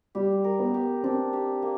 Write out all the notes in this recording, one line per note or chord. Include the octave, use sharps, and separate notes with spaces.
G3 G4
A#4
B3
G4
C4 D4
G4
A#3